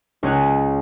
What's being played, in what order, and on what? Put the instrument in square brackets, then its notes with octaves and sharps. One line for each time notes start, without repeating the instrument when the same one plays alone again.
[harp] C#2 C#4 C#5 F#6